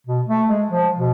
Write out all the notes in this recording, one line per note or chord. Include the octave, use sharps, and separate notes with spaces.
B2
A3
G#3
F3
B2